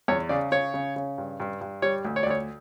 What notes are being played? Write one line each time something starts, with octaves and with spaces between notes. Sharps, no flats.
E2 C#5
C#3 D5
C#3 C#5
C#3
C#3
G2
G2
G2
G3 C#5
D2
C#5
D5
D2 C#5